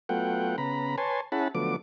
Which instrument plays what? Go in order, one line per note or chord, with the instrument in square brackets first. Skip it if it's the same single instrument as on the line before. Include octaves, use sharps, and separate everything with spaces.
[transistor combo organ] F#3 A3 B3 F4 F#5 G5
C#3 B3 A#5 B5
B4 C#5 G#5 A5 C6
C#4 E4 G#4 F#5 A5 B5
D3 F3 F#3 A3 B3 D6